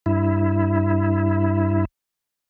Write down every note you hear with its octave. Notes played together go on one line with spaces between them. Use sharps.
G2 E4